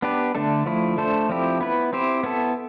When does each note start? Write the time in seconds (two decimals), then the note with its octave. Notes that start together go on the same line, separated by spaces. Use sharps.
0.02 B3 D4 G4 B4
0.35 D3 A3 D4 A4
0.66 F3 A3 E4
0.98 A3 D4 A4 C5
1.29 F3 C4 E4 G4
1.60 B3 E4 B4
1.93 C4 E4 G4 C5
2.23 B3 E4 A4